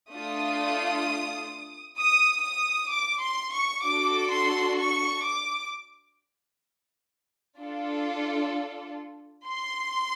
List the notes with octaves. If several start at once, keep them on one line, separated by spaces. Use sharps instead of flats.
A3 D4 F4 D#6
D#6
D#6
D6
C6
C#6
D4 F#4 A4 D6
C6
C#6
D6
D4 F4 A4
C6